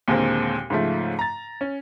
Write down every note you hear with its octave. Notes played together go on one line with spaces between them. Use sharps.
D#2 A#2 D3 G#3 A#3 C4
G#2 C#3 F3 A3 F4
A#5 A6
C#4